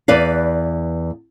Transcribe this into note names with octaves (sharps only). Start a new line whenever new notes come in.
E2 B4 D5 F5